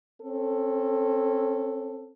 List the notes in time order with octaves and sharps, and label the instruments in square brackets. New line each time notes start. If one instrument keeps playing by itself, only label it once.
[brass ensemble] C4 C#4 A4